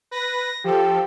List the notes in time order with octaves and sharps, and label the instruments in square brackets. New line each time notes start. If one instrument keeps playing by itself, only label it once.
[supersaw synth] B4 [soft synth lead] A#6
[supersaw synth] F3 A4 [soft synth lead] G4